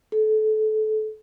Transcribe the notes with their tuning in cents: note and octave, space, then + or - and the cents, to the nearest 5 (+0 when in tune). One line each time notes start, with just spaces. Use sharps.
A4 -25